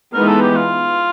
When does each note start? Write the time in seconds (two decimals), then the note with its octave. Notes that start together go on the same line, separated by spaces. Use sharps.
0.14 E3 G#3 B3 D#4 A#4
0.28 A4
0.42 G4
0.57 F4